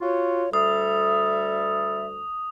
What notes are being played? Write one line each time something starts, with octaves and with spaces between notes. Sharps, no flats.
F4 F#4 C#5
D2 G3 A4 E5 D#6